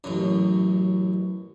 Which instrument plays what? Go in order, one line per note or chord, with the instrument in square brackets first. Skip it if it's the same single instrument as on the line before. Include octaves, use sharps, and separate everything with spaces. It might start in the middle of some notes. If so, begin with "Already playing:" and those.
[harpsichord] A1 F#2